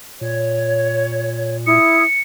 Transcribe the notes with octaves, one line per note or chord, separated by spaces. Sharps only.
A#2 C#5
E4 D#6 C#7